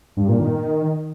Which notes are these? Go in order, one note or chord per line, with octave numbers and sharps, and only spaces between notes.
G2
A#2
D#3